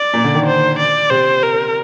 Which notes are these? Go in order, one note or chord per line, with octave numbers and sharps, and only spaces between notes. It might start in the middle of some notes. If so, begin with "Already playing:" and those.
Already playing: D5
A#2
D3
D#3
C5
D5
C3 C5
A#4